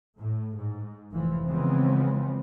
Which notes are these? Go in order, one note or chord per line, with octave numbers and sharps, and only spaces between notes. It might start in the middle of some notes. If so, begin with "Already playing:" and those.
A2
G#2
F1 E3 F3
C#3 E3 F3 G#3 B3 C4